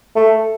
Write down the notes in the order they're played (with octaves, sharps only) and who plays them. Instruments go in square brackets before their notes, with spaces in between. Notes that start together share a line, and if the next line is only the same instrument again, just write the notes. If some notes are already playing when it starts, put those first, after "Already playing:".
[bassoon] A3